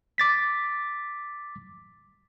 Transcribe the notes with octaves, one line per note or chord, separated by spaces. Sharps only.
D6 A6 B6